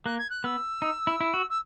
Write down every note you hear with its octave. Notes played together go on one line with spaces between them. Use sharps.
A#3 F#6
G#6
F#6
B3 E6
D#4
E4
E4
F#4
E6